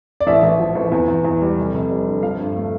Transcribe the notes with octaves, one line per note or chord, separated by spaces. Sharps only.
D5
A1 E5
A1
F3
A1
E2
E2
E2
G3
F1
F1
G3
D3
F3 F5
G2
A3